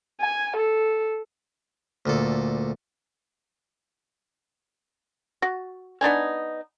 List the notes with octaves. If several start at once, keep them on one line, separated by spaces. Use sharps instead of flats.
G#5
A4
D2 A#2 A4
F#4
B3 D4 D#4 G#5